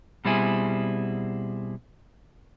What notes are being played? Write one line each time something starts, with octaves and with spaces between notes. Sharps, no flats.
B2 G3 C4 E4 G#4